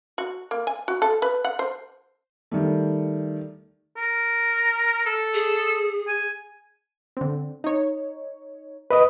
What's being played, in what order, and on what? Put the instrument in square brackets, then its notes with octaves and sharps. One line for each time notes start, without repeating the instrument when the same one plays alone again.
[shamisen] F#4
A#3
G#5
F#4
A4
B4
F#5
C5
[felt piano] D#3 G3 A3
[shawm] A#4
A4
[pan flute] G#4
[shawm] G#5
[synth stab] D3 C4
D#4 C#5
[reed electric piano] B4 D#5 D#6